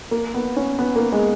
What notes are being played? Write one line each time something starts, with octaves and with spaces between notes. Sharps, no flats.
A#3
B3
C#4
B3
A#3
G#3